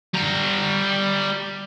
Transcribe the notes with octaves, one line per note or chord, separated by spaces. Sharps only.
G3 A#5